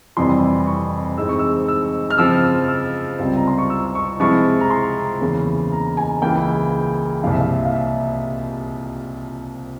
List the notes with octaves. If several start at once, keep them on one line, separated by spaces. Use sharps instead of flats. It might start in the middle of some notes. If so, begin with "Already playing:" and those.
F2 C3 E3 G3 C6
C#6
G#2 E3 G#3 C4 E6
C#6
E6
E6
F6
C#3 F3 C4 F4 E6
E6
E6
C#2 C3 G3 C4 F4
A#5
C6
C#6
E6
C#6
C3 F3 G#3 E4 C#6
A#5
C6
E2 C#3 E3 A#3 C#4
A#5
G#5
C#2 C#3 E3 A#3 G5
C2 A#2 F3 F5
E5
F5
F5
E5